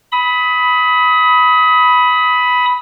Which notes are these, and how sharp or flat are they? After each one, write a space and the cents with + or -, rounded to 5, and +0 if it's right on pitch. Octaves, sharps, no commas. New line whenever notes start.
B5 +0 D#6 +30